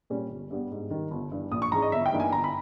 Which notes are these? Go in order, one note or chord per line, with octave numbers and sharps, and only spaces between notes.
A#2 G3 C#4
G1
G2 G3 B3
G#2
D#3 G3
G1
G2 E3 G3
A#1 D#6
C#6
G#2 E3 G#3 C#4 A#5
D#5
G1 E5
G5
G2 E3 A#3 D#4
G#5
G1 A#5
B5